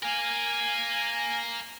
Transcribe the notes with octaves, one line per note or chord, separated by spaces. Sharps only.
A#4 F5 G#5